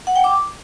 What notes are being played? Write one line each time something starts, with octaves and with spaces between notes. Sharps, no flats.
F#5
G5
D6